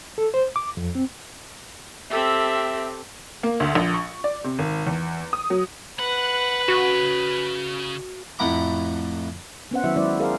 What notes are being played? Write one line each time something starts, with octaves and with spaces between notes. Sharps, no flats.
A4
C5
D6
F2
C4
C4 G4 A4 E5
A#3
D2
A#1
C#6
D5
C3
G#1
E2
D#6
F#3
B4 F#5
C#3 F#4
F2 A2 F#5 A#5 B5 D6
B3 C#4 C5 F#5
D#3 F#3 E4 F#4 E5
F#3 G#3 C#4 E4 C5 D5
F#4 G#4 A#4 C5 F5